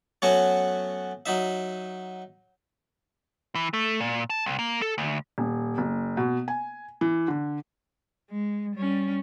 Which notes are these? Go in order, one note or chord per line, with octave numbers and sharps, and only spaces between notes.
F#3 A3 B3 C#4 F#4 C#5
F#3 D#4 E5
E3
A3
A#2
A5
C2
A#3
A4
D2
D#1
F#1
B2
G#5
E3
D3
G#3
G3 C#4